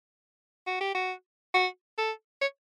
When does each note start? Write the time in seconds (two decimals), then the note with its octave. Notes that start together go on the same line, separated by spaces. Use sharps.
0.67 F#4
0.81 G4
0.95 F#4
1.54 F#4
1.98 A4
2.41 C#5